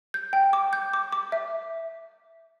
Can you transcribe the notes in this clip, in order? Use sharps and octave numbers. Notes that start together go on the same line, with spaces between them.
G6
G5
D6
G6
D6
D6
E5